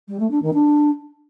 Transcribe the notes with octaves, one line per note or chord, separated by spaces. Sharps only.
G3
A3
D4
D#3
D4